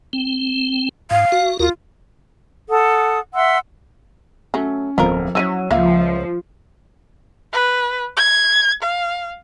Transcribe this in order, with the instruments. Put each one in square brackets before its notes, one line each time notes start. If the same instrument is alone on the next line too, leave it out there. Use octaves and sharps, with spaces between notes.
[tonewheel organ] C4
[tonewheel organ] G#2 [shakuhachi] F5
[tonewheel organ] F#4
[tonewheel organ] D#2 F#4 A#4 [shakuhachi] F4
[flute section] A4 F#5 D#6
E5 F#5 C6 E6
[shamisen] F#3 A3 [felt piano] C#4
[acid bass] D1 [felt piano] F2 [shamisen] B3 F4 A#4
[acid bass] F#3 [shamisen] C#4 D#4 E4 [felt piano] E6 D#7
[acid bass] C#2 [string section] F3 [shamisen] A#3 [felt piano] E5 F5
[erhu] B4
G#6
F5